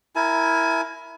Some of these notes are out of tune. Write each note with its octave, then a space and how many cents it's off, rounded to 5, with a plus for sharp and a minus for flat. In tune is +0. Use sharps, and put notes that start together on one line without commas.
E4 +0 A#4 +0 G#5 +35